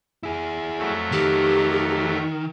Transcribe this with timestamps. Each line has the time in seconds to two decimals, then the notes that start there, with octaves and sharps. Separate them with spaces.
0.23 E4 G#4
0.78 F2 F#3 A3
1.12 D#3 G4